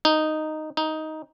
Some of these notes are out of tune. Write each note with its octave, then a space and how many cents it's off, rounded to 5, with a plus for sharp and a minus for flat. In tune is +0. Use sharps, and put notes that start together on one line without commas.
D#4 -5
D#4 +10